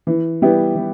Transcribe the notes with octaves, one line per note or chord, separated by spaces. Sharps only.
E3
G3 B3 E4 G4
E3